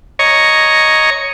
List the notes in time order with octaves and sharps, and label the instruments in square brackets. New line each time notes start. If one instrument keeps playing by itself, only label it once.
[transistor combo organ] C#5 D#5 A#5 C#6